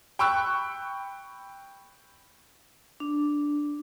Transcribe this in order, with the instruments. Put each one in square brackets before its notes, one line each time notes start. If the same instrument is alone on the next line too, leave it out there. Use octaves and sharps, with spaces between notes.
[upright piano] G5 B5 C#6 E6 F#6
[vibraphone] D4